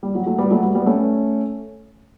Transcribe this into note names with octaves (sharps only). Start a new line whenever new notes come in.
G3
F#3
F#3 A3
G3 B3
F#3 A3
G3
G3 B3
A3 C#4